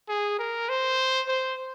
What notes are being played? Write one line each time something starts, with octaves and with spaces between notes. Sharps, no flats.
G#4
A#4
C5
C5